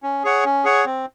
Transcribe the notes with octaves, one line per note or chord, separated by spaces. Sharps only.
C#4
G#4 C#5 F#5
C#4
G#4 C#5 F#5
C4